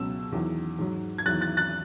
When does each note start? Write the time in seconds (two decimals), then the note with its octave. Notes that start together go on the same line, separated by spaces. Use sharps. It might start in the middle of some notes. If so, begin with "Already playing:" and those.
Already playing: C#2 B2 F#3 E6
0.32 E2 D#3 F#3
0.78 G#2 F#3
1.18 G#6
1.26 E2 D#3 F#3 F#6 A6
1.41 F#6 A6
1.57 F#6 A6